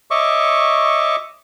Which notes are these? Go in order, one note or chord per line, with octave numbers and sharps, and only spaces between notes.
C#5 D#5 E5 C#6 D6